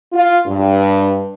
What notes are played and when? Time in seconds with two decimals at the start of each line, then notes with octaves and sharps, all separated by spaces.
0.13 F4
0.47 G2